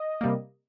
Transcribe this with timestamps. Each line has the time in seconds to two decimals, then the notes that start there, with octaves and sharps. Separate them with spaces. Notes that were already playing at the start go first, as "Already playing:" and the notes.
Already playing: D#5
0.21 C3 G3 A#3